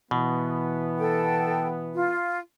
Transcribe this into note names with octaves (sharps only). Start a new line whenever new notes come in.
B2 E3 B3
A4 G5
F4